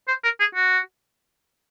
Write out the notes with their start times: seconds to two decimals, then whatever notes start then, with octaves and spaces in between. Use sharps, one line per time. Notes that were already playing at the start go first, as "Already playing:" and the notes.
0.08 C5
0.24 A#4
0.40 G#4
0.55 F#4